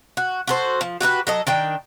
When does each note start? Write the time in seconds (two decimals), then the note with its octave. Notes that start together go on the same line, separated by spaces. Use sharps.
0.17 F#4
0.47 F#4 A4 C5
0.81 F3
1.01 F#4 G4 A4 B4
1.27 F#3 A4 D#5
1.47 D#3 D4 G5